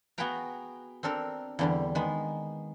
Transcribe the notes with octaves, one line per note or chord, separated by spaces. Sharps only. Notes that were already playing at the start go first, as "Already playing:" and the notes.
B3 F#4 G#4 B4 G5 A#5
C4 D4 A4 A#4
E2 D3 G3
D#3 G#3 B3